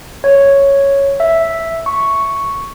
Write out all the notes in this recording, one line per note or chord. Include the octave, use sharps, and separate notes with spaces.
C#5
E5
C#6